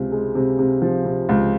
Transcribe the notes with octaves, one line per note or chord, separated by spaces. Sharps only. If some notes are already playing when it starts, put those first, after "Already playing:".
Already playing: C#2 C3
G#3
C3
C3
F3
C3
C#2